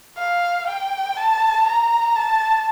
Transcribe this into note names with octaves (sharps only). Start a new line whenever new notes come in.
F5
G5
A5
A#5
A5